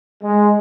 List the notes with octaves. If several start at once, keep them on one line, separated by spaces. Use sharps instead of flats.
G#3